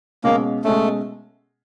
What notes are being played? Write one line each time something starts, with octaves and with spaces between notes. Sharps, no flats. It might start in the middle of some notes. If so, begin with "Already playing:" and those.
B2 G#3 A#3 C#4
B2 G#3 A3 C#4